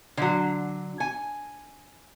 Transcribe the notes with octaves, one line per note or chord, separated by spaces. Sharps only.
D3 F#3
G#5